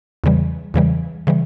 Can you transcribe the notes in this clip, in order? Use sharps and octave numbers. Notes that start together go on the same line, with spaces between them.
E2 C#3 E3 G3
E2 C#3 E3 G3
C#3 E3 G3